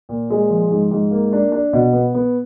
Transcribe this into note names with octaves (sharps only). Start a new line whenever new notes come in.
A#2
G#3
F3
G#2
G#2
A#3
D4
D4
B2
B3
B3